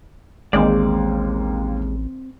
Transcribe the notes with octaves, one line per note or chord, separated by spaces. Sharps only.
A1 D#2 G#3 A#3 C4 D5